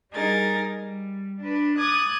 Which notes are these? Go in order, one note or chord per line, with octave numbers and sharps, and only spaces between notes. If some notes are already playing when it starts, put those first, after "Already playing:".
G3 D#4 G#4 A#4 A6
G3
D4 B4
D6 D#6 F#6 G#6 A6